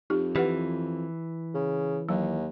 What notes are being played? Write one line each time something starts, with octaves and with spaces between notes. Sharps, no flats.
F2 D#4 G4
E3 G4 B4 F#5
C#3
D#2 F#3